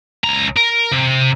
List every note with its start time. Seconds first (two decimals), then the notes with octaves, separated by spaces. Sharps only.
0.24 C#2 A#5
0.56 A#4
0.92 C3